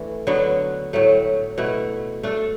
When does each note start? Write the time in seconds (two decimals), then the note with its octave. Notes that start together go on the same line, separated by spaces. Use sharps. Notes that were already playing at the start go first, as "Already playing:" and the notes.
Already playing: E3 A3 D4
0.27 D3 F#3 B3 F#4
0.93 A2 F#3 A3
1.58 B2 A3 E4
2.23 A3 D4 A4